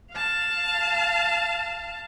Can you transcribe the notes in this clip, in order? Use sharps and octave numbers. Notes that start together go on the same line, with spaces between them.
F5 A5